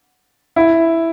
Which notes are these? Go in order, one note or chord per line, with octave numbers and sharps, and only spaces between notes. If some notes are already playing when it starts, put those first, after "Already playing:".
E4